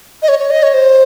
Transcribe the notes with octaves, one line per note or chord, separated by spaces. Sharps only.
D#5
C#5
C#5
D#5
C#5
C5